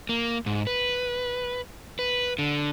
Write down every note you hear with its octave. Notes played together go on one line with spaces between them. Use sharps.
A#3
G#2
B4
B4
D3